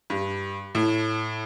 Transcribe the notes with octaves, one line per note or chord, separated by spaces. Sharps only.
G2
A2